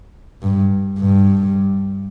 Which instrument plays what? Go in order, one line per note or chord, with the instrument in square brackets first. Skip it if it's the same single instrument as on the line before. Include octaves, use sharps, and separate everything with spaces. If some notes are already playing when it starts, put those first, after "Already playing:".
[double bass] G2
G2